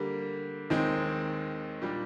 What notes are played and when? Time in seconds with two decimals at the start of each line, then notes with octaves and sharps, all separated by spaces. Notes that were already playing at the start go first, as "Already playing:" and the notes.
Already playing: D3 G3 A#3 G4
0.70 D#2 D#3 G#3 C4 D#4
1.82 A#2 G3 D4